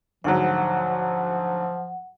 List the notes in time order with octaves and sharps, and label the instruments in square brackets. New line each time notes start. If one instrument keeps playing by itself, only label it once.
[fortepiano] D2 G#2 F#3 [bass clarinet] F3 [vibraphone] F#5